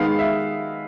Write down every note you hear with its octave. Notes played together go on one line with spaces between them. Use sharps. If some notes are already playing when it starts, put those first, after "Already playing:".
Already playing: D#3 G#3 B3 F5
E5